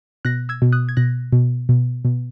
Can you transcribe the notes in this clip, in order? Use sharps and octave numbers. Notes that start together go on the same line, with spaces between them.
B2 F#6 A#6
E6 G#6
B2
D#6 F#6
G#6
B2 F#6 A#6
B2
B2
B2